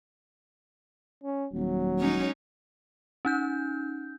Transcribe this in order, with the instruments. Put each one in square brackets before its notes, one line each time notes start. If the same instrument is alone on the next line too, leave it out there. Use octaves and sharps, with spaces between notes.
[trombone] C#4
[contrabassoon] D#1 [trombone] F#3
[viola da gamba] G#3 C#4 D#4
[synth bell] C#4 D#4 G6